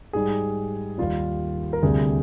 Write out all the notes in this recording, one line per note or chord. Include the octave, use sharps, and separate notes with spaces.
G#2 G3 G#4
D#2 D#3 G3 F4
A#4
D2 C3 G3 G#4